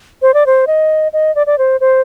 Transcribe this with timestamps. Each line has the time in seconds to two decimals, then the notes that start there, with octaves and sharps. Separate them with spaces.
0.22 C5
0.34 D5
0.46 C5
0.67 D#5
1.13 D#5
1.35 D5
1.47 D5
1.58 C5
1.81 C5